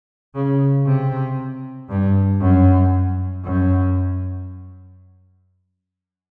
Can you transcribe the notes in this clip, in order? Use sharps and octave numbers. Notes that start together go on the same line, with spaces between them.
C#3
C3
G2
F#2
F#2